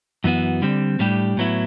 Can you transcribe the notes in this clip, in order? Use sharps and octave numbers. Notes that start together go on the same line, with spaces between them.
F#2 E3 B3 F#4
D3 G3 C4
A2 G3 D4 G4
A2 F#3 B3 E4